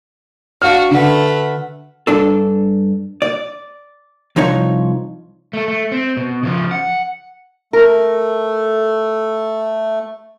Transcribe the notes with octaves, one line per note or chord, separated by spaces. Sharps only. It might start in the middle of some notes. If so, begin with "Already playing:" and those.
D4 F#4 F5 F6
D3 A3 B4 F#5
G2 D4 A4
D5
C2 F3 D#4 C#5
A3 A4
A3
C4
B2
C#3 F3
F#5
A3 A#4